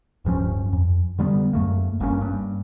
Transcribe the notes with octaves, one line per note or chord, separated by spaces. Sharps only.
D1 G2 F3 C#4
F2
D3 G3 A3 B3
F#2 A3 A#3
G1 G2 A#3 C#4
G2